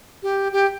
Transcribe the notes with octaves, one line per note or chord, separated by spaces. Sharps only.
G4
G4